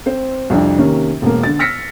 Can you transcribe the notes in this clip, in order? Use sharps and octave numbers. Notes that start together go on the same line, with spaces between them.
C4 C5
C2 F2 D4
C3 D#3 A#3 C#4
E1 A#3
D3 A6
E6 F6 A#6 B6 C#7